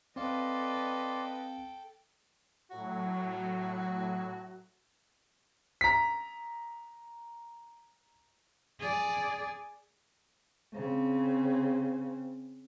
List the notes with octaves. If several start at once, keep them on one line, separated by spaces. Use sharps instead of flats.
C4 A4 B4 D5 D#5 F5 G5 C6
A2 F#3 F#4
A#5 B6
G#4 D5
C#3 C4